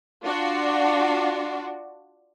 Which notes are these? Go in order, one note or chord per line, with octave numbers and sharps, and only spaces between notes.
D4 F4 F#4